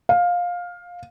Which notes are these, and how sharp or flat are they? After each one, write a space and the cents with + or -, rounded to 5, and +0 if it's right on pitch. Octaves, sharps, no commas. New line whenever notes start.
F5 +15